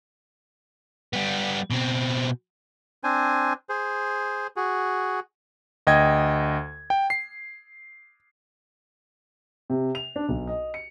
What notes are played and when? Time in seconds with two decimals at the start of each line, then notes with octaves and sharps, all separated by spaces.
1.13 G3 B3
1.70 B2 C4
3.04 C4 D4 C5 G#5
3.69 G#4 C5
4.56 F#4 G#4
5.87 D2 D#5 G5 G#6
6.90 G5
7.10 C7
9.70 C3
9.95 F7
10.16 D4
10.29 B1
10.47 D#5
10.74 C#7